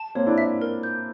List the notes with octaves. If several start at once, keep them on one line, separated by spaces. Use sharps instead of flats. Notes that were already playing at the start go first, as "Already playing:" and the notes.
Already playing: A5
A#3 C4 C#5
D4 E4
E5
A#4
G6